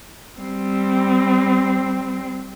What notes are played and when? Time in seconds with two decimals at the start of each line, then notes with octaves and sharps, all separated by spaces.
0.39 G3 C4